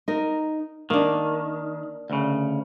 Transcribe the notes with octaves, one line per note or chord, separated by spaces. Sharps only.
D#4 A#4
D#3 A#3 D4
D2 C#3